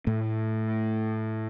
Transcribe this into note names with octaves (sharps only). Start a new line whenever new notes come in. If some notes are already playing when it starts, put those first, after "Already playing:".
A2 A3